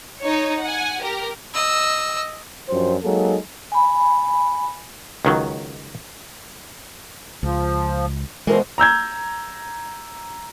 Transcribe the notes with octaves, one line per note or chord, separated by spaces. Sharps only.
D#4 C#5
F#5 G#5
G4 A#4
D#5 E6
F#2 F3 F#3 D4 G4 C5
F#3 G#3 A#3 D#4 G#4 A4
G#5 B5
C#2 D#3 F#3
C#2 F3
B2 E3 G#3 A#4 C5
A#5 E6 G6 G#6